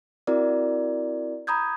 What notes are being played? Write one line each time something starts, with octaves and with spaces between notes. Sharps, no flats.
C4 E4 F#4 A#4 D5
A#5 B5 D#6 G6 G#6